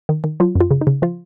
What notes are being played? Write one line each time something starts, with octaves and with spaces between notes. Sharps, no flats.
D#3
D#3
F#3 F4
F#2
F4
C#3
D#4
C#3
F3 F4